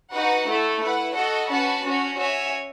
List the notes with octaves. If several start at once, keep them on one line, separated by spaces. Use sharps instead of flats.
D#4 F#4 B4 F#5
A3 E4 A4
E4 B4 F#5
F#4 A4 D#5 F#5
C#4 F#4 B4 F#5 A5
C#4 F#4 C#5
F#4 C#5 E5 G#5